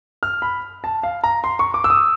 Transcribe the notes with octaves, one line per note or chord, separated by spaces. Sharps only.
F6
B5
A5
F5
A#5
C6
C#6
D6
E6
D#6